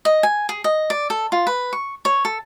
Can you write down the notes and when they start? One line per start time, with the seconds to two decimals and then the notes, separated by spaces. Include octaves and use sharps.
0.05 D#5
0.23 G#5
0.49 G#4
0.64 D#5
0.90 D5
1.10 A4
1.32 F4
1.47 B4
1.73 C#6
2.05 C#5
2.25 A4